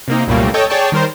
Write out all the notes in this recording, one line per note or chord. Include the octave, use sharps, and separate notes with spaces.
C3 A#3 D#4
C2 F#2 A#2 G3 A3 A#3
A4 C#5 D#5 G5
G#4 C#5 D5 G5 A5
D#3 G3 A#4 C5